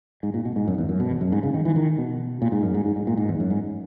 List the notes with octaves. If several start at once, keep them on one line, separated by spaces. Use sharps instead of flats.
G#2
A#2
B2
G#2
F#2
E2
F#2
B2
E2
F#2
G#2
C#3
D#3
E3
D#3
B2
A#2
G#2
F#2
G#2
G#2
G#2
A#2
G#2
E2
F#2
G#2